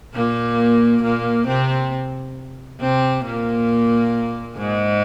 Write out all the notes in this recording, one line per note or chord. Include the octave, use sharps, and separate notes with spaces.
A#2 A#3
A#2 A#3
C3 C4
C3 C4
A#2 A#3
G#2 G#3